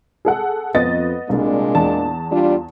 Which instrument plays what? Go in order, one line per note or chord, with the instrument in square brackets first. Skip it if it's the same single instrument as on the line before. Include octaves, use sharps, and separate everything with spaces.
[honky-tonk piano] G#4 A4 F#5
[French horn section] F2 [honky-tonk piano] B3 D#5 A6
[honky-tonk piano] C2 [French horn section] A#2 G#3 D4
[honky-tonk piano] E2 A5
[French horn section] G3 D4 F4